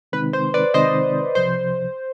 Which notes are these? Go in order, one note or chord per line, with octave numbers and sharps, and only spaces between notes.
C3 D#3 G#3 C4 D#4 B4
C5
B4 D5
C3 D#3 G#3 C4 D#4 C5 D#5
C2 C3 F3 C5